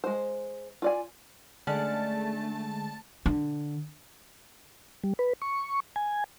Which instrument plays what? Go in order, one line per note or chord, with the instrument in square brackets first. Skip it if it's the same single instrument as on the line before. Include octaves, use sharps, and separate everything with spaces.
[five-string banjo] G#3 C5
F4 D5 G#5
[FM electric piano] D3 G#3 [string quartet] A3 [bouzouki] C#4 D5 F#5 [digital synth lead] A5
[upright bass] D3
[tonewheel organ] G3
B4
C#6
G#5